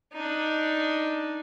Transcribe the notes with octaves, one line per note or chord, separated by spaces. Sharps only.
D4 D#4